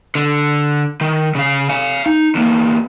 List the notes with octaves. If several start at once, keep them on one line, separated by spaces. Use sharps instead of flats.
D3
D#3
C#3 F5
F5 G#5
D#4
E2 A#3